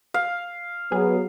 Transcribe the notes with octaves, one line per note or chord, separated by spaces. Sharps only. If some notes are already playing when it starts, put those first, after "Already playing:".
F5
F#3 B3 G#4